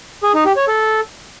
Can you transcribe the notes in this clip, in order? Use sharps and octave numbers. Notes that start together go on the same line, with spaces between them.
G#4
D#4
G4
C#5
A4